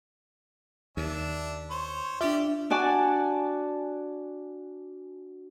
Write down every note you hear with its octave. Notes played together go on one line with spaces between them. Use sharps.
D#2 D4 E5
C5 C#5
D4 F4 G4 D5 E5 G5
D4 F#4 D5 G#5 A5